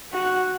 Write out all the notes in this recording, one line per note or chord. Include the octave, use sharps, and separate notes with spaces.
F#4